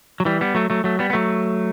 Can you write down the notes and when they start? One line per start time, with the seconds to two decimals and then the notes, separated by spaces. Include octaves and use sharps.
0.20 F#3
0.25 E3 G3
0.41 G3 B3
0.55 F#3 A3
0.70 F#3 A3
0.84 F#3 A3
0.99 G3 B3
1.10 B3
1.13 F#3 A3